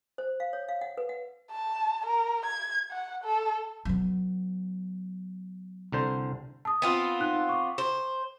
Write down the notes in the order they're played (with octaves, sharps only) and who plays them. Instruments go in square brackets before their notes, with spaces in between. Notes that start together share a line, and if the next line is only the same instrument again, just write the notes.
[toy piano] C5
F5
C#5
F5
F#5
B4
F#5
[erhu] A5
A#4
G#6
F#5
A4
[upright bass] F#3 B3
[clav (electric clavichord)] C2 D3 C5
[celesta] A5 D#6
[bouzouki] B3 C4 F4
[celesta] D#4 F#6
C#6 D6
[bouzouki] C5